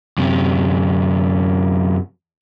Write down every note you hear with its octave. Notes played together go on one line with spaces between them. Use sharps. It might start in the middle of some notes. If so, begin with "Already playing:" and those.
F#2 C3